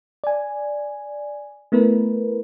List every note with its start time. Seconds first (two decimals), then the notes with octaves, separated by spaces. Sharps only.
0.24 D5 G#5
1.72 A3 B3 E4 A#4 B4